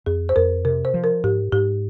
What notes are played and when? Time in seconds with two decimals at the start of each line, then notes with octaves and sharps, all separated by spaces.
0.06 F2 G#4
0.29 C5
0.36 F2 A#4
0.65 C3 A#4
0.85 C5
0.94 F3
1.04 A#4
1.24 G#2 G4
1.52 G#2 G4